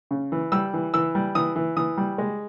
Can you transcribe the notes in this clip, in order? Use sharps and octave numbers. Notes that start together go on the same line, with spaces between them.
C#3
E3
G3 E6
E3
E3 E6
G3
E3 D#6
E3
E3 D#6
G3
G#3